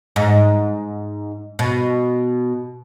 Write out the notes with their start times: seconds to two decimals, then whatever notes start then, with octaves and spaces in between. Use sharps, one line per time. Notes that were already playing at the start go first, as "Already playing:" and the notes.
0.16 G#2
1.59 B2